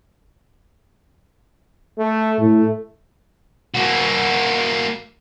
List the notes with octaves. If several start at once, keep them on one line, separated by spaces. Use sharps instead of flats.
A3
A2 A3
A#3 F#4